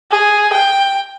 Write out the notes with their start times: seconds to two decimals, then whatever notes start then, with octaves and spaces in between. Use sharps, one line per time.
0.11 G#4
0.53 G5